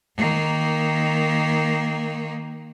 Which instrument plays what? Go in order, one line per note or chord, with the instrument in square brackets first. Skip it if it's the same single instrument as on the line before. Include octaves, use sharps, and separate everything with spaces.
[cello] D#3 A#3